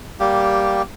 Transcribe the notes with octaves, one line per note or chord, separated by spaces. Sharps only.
G3 A#3 G4